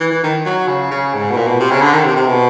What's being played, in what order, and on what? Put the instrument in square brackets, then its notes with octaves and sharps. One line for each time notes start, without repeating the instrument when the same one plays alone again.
[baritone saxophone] E3
E3
D#3
F#3
C#3
C#3
G#2
B2
A#2
B2
C3
C#3
D3
D#3
C3
C3
B2